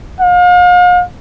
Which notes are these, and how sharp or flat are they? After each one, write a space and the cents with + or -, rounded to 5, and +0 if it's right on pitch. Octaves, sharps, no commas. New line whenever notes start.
F5 +40